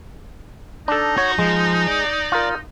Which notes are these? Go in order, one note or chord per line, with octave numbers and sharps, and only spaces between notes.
D4 D#4 A4
F#4 C#5
F3 G#3
D5
F4 A#4